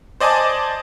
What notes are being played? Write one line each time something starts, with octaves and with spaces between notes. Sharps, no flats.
C5 D5 D#5 G#5 A5 D6